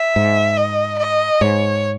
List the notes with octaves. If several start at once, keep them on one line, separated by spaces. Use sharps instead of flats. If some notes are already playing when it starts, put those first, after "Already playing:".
Already playing: E5
G#2
D#5
D#5
G#2 C#5